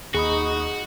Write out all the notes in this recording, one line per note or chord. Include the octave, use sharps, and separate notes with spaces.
D#2 D#4 F#4 G#4 B5 D#6